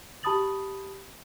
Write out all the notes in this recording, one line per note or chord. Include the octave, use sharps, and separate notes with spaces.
G4 A5 B5 D#6 A6 F#7